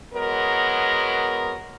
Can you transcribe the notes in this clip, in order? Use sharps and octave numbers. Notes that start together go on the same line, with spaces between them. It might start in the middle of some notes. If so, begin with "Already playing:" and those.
F#3 G#3 B3 A#4